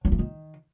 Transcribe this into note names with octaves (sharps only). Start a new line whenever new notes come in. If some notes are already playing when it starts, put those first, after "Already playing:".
F#3
E3
D#3